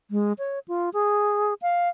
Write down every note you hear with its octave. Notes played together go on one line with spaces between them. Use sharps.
G#3
C#5
F4
G#4
F5